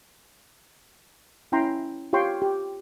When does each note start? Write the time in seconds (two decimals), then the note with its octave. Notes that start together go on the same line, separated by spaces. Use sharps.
1.52 C#4 E4 G5 A#5 C6
2.13 F4 G4 C#5 G5 C6 C#6
2.42 G4